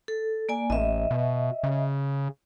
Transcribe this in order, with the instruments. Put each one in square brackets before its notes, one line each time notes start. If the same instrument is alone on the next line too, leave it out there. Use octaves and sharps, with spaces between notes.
[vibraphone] A4
A#3 D5 G#5
[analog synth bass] A1 [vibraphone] D#5 E5
[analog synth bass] B2
C#3